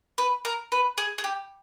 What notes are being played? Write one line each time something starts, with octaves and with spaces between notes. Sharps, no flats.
B4
A#4
B4
G#4
G#4
G4